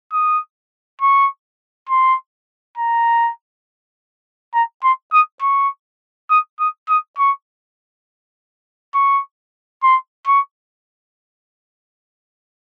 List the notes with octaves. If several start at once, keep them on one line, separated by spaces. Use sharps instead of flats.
D#6
C#6
C6
A#5
A#5
C6
D#6
C#6
D#6
D#6
D#6
C#6
C#6
C6
C#6